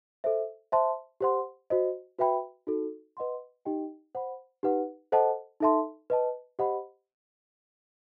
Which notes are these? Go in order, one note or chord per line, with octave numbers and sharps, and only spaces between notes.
A4 C5 E5
C5 E5 A5 C6
G4 C5 F#5 C6
F#4 C5 D#5
F#4 B4 E5 G5 B5
D#4 F#4 A4
B4 D#5 F#5 C6
D#4 G4 D#5 G5
C5 F#5 B5
D#4 G4 B4 F#5
A4 C5 D#5 F#5 A5
D#4 A4 E5 A5 C6
B4 D#5 A5
G4 C5 D#5 F#5 B5